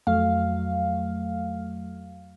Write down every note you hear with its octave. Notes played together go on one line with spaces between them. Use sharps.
F2 F#3 A3 F5